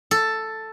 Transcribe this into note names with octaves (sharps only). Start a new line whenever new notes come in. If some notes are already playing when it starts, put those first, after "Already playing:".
A4